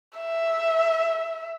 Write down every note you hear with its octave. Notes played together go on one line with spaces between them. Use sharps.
E5